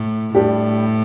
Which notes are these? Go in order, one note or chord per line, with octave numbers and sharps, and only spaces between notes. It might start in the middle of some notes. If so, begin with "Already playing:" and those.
Already playing: A2
A2 G3 D4 G4